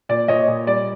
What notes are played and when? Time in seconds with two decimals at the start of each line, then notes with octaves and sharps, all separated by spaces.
0.09 A#2 D5
0.28 A#2 C#5 D#5
0.48 A#2
0.67 G3 D5